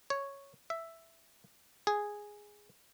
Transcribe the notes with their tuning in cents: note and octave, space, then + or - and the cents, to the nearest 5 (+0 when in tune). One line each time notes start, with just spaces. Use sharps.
C#5 +0
E5 +5
G#4 -5